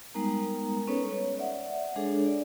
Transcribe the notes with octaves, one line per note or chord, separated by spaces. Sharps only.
G3 G#3 B3 D#4 A#4 A#5
B3 C#4 D#4 A4 B4 C#5
C#5
D5 E5 F#5
G#3 D4 G#4 A4 C#5
D5